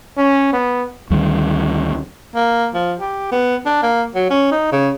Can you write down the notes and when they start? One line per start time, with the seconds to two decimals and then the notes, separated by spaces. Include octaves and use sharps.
0.17 C#4
0.53 B3
1.10 D2 D#3 G3
2.35 A#3
2.74 F3
3.00 G4
3.32 B3
3.66 D4
3.83 A#3
4.15 F#3
4.30 C#4
4.52 D#4
4.72 C#3